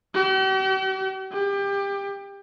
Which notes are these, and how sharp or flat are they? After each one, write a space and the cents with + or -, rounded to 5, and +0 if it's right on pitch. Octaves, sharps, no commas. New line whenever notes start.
G4 -45
G4 +25